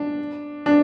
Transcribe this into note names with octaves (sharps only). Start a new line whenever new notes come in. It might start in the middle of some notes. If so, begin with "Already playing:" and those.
Already playing: D4
D4